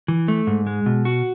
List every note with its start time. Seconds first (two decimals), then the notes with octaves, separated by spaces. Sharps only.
0.08 E3
0.28 A3
0.47 G#2
0.67 G#3
0.86 B2
1.05 F#4